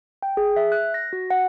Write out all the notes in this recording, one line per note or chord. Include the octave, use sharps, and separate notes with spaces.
G5
G#4
E5
F#6
A#6
F#4
F#5